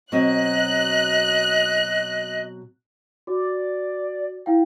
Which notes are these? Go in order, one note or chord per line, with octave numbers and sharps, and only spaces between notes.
B2 F#3 C4 D#5 F#6
F#4 D5
E4 F5 G5